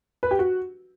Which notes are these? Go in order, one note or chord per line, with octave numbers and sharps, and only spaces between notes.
B4
G4
F#4